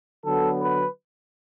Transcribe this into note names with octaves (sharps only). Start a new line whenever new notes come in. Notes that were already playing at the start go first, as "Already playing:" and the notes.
D3 F#3 B3 A4
B4